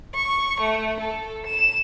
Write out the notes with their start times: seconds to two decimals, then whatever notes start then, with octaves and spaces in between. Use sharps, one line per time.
0.15 C#6
0.60 A3
1.00 A4
1.46 E7